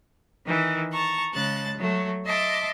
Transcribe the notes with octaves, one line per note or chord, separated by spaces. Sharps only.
D#3 E3
A5 A#5 C#6
C#3 G#3 A5 F#6 A6
F#3 A3
D#5 E5 A5 C6 D6